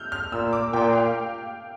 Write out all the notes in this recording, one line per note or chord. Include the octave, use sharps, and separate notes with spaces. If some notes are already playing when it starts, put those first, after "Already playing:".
Already playing: E6 F6 G6
F6
A#2 E6
D6
A#2 G5
F5